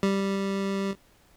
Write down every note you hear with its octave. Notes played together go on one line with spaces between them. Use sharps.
G3